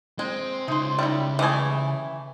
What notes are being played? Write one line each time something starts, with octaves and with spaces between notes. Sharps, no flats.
G#3 C4 C5
C#3 D#4 D#5 C6
G3 D#4 E4
E3 A3 G4 G#4 G#5